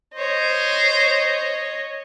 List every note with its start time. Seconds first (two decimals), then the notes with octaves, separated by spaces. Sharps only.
0.15 C5 C#5 D#5